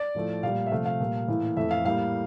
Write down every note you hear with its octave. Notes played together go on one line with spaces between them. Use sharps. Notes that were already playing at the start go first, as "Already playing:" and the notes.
Already playing: D5
A2 F3 A3
A#2 G3 A#3 F5
E5
C3 F3 A3 F5
F5
A#2 G3 A#3
A2 E3 A#3
F2 E3 A3 E5
F5
A2 G3 A#3 F5